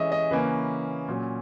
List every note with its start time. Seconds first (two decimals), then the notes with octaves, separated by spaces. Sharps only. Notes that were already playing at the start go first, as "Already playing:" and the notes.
Already playing: E3 G#3 C#4 D#5 E5
0.12 D#5
0.31 C#3 E3 A#3 C#4 B4
1.08 A#2 F#3 C#4